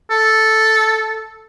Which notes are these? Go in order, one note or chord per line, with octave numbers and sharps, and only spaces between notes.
A4